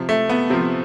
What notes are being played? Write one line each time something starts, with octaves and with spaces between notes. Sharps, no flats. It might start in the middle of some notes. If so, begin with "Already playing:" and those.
Already playing: C3 F3
A3
B3
C3 F3 C4